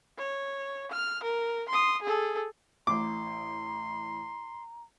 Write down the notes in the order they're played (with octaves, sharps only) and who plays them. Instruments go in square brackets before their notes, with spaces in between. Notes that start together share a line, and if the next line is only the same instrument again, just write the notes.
[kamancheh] C#5
F6
A#4
C6 D#6
G#4 A4
[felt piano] A1 A2 [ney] A#5 [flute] C6 [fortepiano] D6